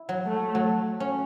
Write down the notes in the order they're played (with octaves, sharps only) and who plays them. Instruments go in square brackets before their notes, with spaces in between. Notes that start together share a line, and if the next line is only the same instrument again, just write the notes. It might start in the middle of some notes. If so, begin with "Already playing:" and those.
Already playing: [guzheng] E4
F#3
[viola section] A3
[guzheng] F#3
C#4